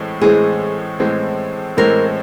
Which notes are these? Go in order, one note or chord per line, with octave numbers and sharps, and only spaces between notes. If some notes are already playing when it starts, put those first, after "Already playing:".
Already playing: A2 E3 G#3 C4
A2 E3 G#3 C4 G#4
A2 E3 G#3 C4
A2 E3 G#3 C4 A#4